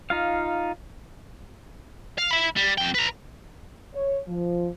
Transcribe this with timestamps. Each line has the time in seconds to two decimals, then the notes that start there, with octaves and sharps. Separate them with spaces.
0.10 D#4 F4 F5
2.18 F5
2.31 E5 B5
2.56 G3
2.78 F2 G5
2.94 B4 A#5
3.94 C#5
4.28 F3